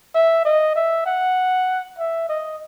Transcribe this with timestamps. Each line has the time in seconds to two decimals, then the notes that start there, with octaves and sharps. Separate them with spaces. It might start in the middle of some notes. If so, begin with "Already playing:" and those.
0.15 E5
0.45 D#5
0.76 E5
1.06 F#5
1.99 E5
2.29 D#5